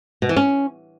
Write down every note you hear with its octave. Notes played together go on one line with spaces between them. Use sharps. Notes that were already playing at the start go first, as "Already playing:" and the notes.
B2
E3
C#4